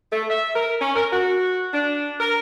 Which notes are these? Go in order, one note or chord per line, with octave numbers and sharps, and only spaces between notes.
A3
E5
A#4
C#4
A#4
F#4
D4
A#4